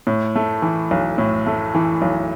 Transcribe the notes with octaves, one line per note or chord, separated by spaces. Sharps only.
A2
A3
E3
B1
A2
A3
E3
B1